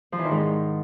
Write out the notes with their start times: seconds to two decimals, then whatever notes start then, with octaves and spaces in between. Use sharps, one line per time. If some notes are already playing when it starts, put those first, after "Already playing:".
0.12 F3
0.19 E3
0.25 D#3
0.31 G#2